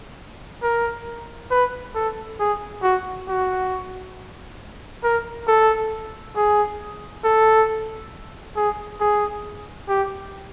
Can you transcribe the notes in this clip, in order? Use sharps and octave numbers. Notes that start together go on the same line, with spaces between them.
A#4
B4
A4
G#4
F#4
F#4
A#4
A4
G#4
A4
G#4
G#4
G4